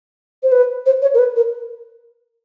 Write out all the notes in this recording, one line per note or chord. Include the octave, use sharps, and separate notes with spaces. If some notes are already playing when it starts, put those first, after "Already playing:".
C5
B4
C5
C#5
A#4
B4
A#4